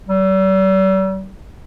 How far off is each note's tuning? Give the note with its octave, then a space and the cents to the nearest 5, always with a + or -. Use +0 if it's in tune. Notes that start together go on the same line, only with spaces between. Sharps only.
G3 -45